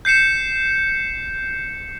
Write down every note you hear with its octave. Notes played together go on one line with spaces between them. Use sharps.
G6 C7 C#7 E7